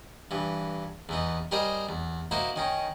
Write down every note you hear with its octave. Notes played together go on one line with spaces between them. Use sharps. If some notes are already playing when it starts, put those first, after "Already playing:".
G2 E3
E2 E3 D#4
G3 D#4 G#4 A#4 C5 D#5
E2
A#3 D#4 E4 F#4 C5
D#3 C#4 D#4